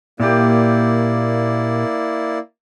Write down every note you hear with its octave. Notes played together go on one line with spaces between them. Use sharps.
A#2 A#3 E4 G4 D5